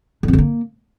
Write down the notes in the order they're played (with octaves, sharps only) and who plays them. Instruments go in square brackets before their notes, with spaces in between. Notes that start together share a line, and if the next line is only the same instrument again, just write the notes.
[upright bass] D3
F2
D3
A#3